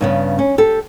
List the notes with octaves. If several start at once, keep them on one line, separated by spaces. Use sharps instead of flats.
G2 C#3 B3
C#4
G4 A4